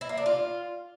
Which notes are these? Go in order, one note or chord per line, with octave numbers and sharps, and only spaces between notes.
E4
A#3
D4
F4